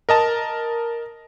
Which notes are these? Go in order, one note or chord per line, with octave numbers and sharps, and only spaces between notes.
A#4 D#5 A5